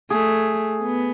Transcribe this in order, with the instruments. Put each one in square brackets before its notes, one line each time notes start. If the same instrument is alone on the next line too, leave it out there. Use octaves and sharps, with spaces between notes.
[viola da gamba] A3 [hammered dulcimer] G#4
[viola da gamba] B3